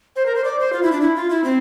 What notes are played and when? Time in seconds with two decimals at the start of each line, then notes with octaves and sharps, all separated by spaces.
0.16 C5
0.26 A#4
0.35 C5
0.44 D5
0.59 C5
0.73 F4
0.83 E4
0.92 D4
1.02 E4
1.16 F4
1.30 E4
1.44 C4